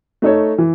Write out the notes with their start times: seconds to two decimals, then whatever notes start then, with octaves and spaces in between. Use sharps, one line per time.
0.22 A3 D#4 A4 C#5
0.58 E3